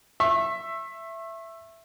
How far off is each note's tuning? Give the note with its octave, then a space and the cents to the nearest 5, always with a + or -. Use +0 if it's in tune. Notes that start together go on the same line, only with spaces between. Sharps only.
E5 +10 C#6 -35